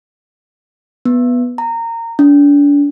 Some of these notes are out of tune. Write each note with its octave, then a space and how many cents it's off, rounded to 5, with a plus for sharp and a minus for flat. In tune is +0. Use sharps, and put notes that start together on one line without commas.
B3 -5
A#5 -20
D4 -35